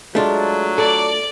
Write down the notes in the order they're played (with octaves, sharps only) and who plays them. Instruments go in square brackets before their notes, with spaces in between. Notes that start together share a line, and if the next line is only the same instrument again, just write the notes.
[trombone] F#3 [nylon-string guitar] G#3 [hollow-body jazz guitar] A3 D4 F4
[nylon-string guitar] A4 [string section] D5